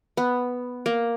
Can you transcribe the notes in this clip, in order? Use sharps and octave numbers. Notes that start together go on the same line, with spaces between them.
B3
A#3